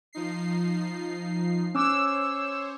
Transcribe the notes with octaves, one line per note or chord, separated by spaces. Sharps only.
F3 D#4 C7
C#4 C5 C#5 D6 E6